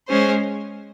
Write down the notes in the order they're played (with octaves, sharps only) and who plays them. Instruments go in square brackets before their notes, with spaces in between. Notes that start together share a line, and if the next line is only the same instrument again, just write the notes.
[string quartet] G#3 C#4 G#4 C5